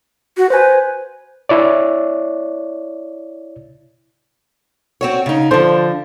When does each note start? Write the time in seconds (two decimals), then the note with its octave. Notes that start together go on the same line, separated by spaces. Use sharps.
0.37 F#4
0.50 B4 C5 G#5
1.49 E4 C#5 D5
5.01 C4 F#4 C#5
5.26 C#3 D#4
5.51 D3 F3 C5